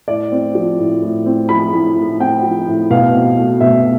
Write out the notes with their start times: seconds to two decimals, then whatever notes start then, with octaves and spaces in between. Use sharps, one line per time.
0.08 A2 D5
0.32 C4
0.55 F3
0.78 A2
1.02 A2
1.26 C4
1.49 F3 B5
1.73 A2
1.97 A2
2.20 C4 G5
2.43 F3
2.67 A2
2.90 B2 F5
3.14 C4
3.37 A3
3.61 B2 E5